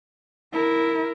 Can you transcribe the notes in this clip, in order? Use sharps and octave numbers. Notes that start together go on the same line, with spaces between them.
E4 A#4